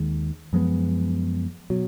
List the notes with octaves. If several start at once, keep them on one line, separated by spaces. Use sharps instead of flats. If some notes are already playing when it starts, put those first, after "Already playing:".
Already playing: D#2 D#3 G#3
F#2 F3 G#3 B3
B2 F#3